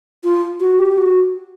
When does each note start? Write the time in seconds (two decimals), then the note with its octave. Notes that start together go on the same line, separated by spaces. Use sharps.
0.24 F4
0.60 F#4
0.79 G4
0.98 F#4